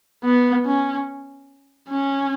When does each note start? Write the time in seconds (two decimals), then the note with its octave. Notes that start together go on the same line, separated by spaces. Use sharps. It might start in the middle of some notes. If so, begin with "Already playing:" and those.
0.24 B3
0.66 C#4
1.90 C#4